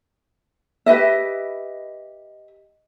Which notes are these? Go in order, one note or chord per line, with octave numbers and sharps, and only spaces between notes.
G4 B4 D#5 E5